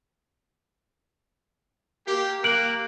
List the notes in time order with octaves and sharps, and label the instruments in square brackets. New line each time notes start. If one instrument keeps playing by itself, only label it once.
[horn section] A#3 G4
[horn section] A#3 [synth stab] F#6 [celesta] D7